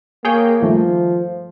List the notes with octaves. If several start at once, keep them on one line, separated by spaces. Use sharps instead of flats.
A#3 G#4 C#5 G5
G2 D#3 F3 A3